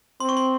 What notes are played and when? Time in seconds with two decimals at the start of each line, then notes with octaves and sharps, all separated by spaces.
0.20 C4 C6
0.29 C#6
0.37 C6